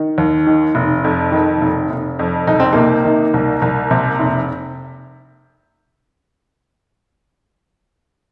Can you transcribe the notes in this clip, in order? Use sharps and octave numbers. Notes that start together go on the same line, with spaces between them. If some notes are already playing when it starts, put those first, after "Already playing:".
Already playing: D#3
D#2
D#3
F1
F2
D#3
F1
F1
F2
C2 D#4
C4
C3 A#3 D#4
D#3
C2
C2
C3
F1